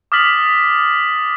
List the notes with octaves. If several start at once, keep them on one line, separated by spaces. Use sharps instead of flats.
D6 D#6 F6 A6 B6 F#7